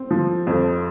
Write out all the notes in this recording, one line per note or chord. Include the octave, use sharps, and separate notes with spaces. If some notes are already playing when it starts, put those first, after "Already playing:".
Already playing: C4
F3
F2